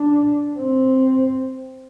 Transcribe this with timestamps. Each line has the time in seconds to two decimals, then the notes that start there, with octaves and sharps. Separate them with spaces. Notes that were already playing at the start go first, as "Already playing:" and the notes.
Already playing: D4
0.59 C4